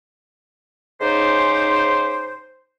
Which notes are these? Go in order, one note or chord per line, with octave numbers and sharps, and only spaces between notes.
G#2 C#3 D#4 G4 C5